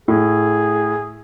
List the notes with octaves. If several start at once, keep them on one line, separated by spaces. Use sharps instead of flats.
A2 G#4